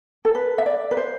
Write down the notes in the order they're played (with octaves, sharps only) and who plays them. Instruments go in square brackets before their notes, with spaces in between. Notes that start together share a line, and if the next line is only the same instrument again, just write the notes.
[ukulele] A4
B4
E5
D5
B4
C5